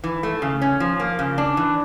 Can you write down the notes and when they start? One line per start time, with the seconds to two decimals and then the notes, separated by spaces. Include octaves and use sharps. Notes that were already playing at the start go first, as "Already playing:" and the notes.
0.04 E3
0.23 A3
0.42 C#3
0.61 C#4
0.80 F3
1.00 A#3
1.19 C#3
1.38 D4
1.57 E3